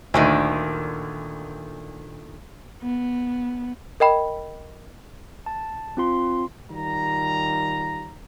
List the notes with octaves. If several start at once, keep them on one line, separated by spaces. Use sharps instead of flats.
D2 A#2 D3 D#3
B3
A#4 D#5 G5 B5
A5
C4 F4 C6
D#3 G3 F4 A#5